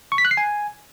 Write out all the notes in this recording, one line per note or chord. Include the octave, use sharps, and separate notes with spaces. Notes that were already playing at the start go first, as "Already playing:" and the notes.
C#6
B6
F#6
C7
G#5